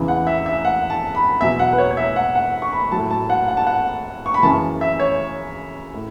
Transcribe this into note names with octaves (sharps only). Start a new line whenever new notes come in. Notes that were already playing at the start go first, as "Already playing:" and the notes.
Already playing: E2 C#3 E3
F#5
E5
E5
F#5
A5
B5
E2 B2 F#3 E5
F#5
B4
C#5
C#5
E5
F#5
F#5
C#6
B5
A2 F#3 A5
A5
F#5
F#5
A5
F#5
C#6
B5
F#2 C#3 E3 A5
E5
C#5
A2